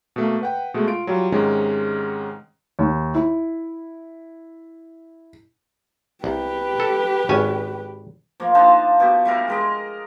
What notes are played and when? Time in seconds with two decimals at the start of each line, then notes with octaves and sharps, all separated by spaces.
0.16 B2 A3 A#3
0.41 B4 F#5 G5
0.74 B2 G#3 A3
0.87 F4 D7
1.07 F#3 G3 F4
1.32 G#2 C3 D#3 G#3 C#4
2.79 D#2
3.14 E4
6.24 C2 G4 B4
6.80 A4
7.29 G#1 C#4 G#5
8.40 F3 A#3
8.55 D4 D#4 F4 A5
9.00 B2 G4
9.25 G3 E4 A#4
9.48 G#3 A#4 D#5